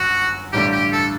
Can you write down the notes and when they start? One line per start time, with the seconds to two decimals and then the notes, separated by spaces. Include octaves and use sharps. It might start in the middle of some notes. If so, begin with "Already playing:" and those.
Already playing: G1 F#2 F#4
0.53 A1 G2 D3 A3 G4
0.73 G4
0.92 A4